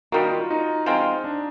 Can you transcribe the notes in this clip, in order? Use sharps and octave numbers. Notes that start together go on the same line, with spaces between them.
D#3 G3 A#3 F#4
F4
D#4
F3 G#3 C4 F4
D4